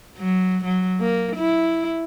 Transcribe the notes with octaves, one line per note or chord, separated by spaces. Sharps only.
F#3
F#3
A#3
E4